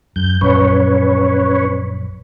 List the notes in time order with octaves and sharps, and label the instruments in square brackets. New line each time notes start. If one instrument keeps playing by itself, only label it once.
[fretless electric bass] F#2 [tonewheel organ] G6
[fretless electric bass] A#1 F#2 [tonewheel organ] C#4 B4 C#5